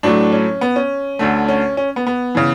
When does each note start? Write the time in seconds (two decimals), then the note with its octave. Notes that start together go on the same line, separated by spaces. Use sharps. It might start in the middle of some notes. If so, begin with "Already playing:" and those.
0.03 A2 F#3 A3 D4
0.32 C#4
0.61 B3
0.76 C#4
1.19 D2 D3 A3
1.48 C#4
1.77 C#4
1.96 B3
2.07 B3
2.35 C#3 E3